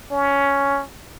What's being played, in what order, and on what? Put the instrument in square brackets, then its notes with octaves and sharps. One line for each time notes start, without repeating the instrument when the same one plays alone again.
[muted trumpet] C#4